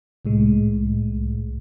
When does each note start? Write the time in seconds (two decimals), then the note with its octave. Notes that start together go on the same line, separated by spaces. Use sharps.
0.25 C2 A2 G#3